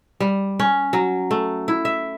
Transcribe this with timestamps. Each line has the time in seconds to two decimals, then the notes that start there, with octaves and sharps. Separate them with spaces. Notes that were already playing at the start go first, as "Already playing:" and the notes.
0.20 G3
0.59 C#4
0.93 F#3
1.31 A3
1.68 E4
1.85 E5